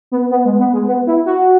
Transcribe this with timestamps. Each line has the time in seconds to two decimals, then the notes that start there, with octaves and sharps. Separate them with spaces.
0.12 B3
0.31 B3
0.45 G#3
0.59 B3
0.73 G#3
0.88 B3
1.07 E4
1.26 F#4